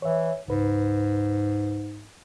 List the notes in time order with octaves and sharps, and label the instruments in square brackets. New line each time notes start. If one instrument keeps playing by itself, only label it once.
[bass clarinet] E3 [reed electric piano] C#5 E5
[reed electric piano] C#2 B4 [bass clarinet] G#2